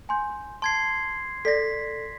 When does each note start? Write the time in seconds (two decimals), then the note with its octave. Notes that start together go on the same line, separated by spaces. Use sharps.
0.09 G#5 C6 G6
0.62 A5 C6 G#6 C7
1.45 A4 D5 A#6 B6